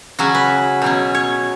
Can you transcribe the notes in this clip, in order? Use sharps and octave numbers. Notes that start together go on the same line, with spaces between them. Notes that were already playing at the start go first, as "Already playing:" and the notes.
C#3 F#3 C#4 F#4
B4
B2 F#3 C#4
C#5